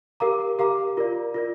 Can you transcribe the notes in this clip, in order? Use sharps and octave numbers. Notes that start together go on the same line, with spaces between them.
G4 A#4 F5 A#5 D6
G4 A#4 F5 A#5 D6
F4 A#4 D5
F4 A#4 D5